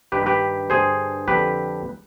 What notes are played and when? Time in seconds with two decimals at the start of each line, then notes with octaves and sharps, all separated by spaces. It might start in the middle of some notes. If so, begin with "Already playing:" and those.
0.12 G2 D#3 G4 B4
0.26 G4 B4
0.70 G2 D3 G#4 C5
1.28 F2 D3 G4 B4